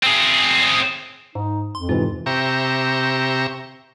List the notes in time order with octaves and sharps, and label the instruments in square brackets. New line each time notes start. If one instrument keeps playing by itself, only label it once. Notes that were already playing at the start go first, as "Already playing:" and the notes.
[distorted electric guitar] C4 G#4
[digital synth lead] G#2 [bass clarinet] D#4
[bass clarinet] F2 [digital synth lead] C6
[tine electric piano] G#2 C3 E3 [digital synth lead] F4
[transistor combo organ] C3 G4 E5 A#5 C#6